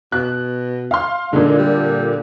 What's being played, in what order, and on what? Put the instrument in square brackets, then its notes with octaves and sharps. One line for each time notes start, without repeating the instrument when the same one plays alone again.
[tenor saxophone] B2 [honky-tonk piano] F#6
[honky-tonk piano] F5 C6
[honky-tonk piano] A#2 D3 [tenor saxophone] G#3
[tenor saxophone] G3